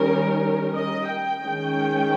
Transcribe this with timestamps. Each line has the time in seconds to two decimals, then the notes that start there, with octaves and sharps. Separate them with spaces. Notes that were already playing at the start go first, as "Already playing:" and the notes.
Already playing: D#3 G3 C#4 A#4
0.75 D#5
1.10 G5
1.44 D#3 G#3 C#4